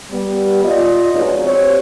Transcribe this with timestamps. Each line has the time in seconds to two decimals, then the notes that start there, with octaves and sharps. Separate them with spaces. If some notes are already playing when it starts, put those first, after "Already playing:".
0.11 G3 B3
0.64 F4 D5 D#5
1.13 F2 B2 G#3 D#4 F#4 C#5
1.44 C4 G4 C#5